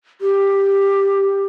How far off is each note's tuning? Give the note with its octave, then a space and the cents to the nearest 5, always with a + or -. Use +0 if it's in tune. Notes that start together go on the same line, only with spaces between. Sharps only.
G4 +10